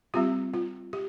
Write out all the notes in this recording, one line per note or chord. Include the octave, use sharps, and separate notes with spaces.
G3 C4 F4 G4
F4
G4